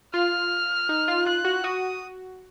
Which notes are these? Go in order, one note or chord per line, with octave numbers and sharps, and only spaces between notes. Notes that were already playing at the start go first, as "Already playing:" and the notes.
F4 F6
D#4
F4
F4 F#6
F#4
F#4 D#6